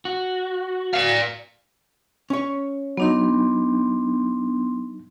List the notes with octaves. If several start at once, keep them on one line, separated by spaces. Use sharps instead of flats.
F#4
D5 F5
C#4 C#5
F#3 B3 D4 D#4 C6